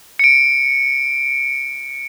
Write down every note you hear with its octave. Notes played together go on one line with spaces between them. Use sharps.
C#7 D7